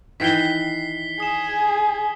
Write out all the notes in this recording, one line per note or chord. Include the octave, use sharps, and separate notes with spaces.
D#3 E3 G5 B6 C7 G7
G#4 D#6 E7